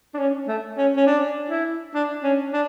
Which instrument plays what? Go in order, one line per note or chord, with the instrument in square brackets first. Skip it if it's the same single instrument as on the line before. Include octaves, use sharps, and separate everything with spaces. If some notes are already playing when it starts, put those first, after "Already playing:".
[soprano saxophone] D4
C#4
A3
C#4
C#4
D4
E4
D4
C#4
D4